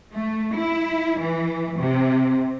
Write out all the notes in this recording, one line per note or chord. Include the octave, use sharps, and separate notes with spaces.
A3
E4
E3
C3